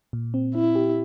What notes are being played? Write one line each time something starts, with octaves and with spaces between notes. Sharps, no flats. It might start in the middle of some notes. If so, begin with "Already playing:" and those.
A#2
C4
C4 E4
G4